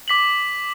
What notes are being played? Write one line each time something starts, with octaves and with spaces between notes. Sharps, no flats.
D6 B6 F#7